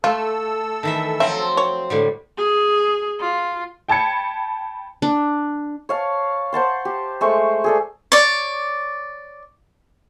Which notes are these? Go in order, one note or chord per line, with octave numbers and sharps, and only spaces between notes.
A3 F4 A4 E6
D#3 E3 E5
F3 F#3 C4 E5
C#5
A2 D3 G3
G#4
F4
G5 A5 B5 G#6 C#7
D4
C#5 F5 A5
C5 F#5 A5 C6
G4
G#3 A3 C5 C#6
G#4 A4 D5
C#5 D5